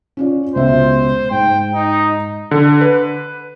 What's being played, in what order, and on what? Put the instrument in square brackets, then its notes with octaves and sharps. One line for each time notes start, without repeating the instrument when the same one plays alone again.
[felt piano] C#4 F4 D5
[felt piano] C#2 B2 E5 [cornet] C5
[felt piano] G#2 [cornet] G5
[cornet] D#4
[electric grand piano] D3
B4